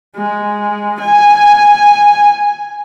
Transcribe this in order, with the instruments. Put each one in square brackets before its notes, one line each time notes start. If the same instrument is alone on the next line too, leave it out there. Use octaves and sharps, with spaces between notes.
[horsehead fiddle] G#3
G#5